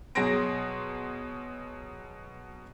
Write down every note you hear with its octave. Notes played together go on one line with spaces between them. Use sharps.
B2 F#3 G#4 C6 A#6 D7